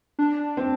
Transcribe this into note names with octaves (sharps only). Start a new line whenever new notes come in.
D4
C4